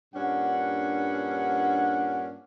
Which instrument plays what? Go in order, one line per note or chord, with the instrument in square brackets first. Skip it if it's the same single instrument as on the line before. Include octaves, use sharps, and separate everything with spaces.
[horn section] G2 A#2 C#4 D4 F#5